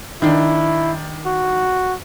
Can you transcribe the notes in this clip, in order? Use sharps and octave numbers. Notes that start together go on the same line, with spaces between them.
D#3 D4 E4
F#4